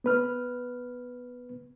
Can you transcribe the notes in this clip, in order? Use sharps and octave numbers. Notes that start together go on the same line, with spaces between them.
B3 B4 F6